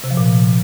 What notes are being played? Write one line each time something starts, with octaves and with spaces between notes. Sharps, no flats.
C3
F3
A#2